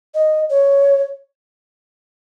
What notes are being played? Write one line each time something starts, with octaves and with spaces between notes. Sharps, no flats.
D#5
C#5